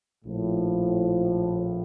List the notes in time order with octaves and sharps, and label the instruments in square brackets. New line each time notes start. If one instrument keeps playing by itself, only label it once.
[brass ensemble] A#1 A2 F3